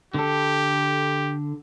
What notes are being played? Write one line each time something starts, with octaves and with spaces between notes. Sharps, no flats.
D3 G4 A4